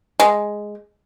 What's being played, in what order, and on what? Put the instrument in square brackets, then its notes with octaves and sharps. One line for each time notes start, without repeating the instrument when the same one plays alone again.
[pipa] G#3